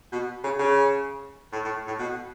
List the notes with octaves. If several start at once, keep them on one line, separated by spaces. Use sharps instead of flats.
B2
C#3
C#3
A2
A2
A2
B2